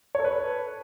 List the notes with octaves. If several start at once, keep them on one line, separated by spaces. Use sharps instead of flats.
A4 B4 C#5